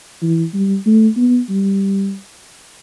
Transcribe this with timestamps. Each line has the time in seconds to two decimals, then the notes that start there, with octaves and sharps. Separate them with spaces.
0.22 E3
0.54 G3
0.86 A3
1.17 B3
1.49 G3